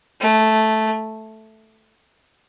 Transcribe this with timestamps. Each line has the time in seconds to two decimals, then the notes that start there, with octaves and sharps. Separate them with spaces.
0.21 A3